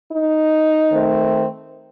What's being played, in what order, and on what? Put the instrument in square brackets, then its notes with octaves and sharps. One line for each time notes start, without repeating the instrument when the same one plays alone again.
[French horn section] D#4
D#3 A3 C4